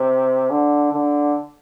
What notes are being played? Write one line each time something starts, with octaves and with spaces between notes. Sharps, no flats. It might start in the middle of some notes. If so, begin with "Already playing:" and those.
Already playing: C3
D3
D3